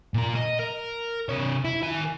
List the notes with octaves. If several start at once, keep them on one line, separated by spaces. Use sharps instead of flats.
A#2 A#4
D#5
A#4
C3 C#5
E4
D#3 G#5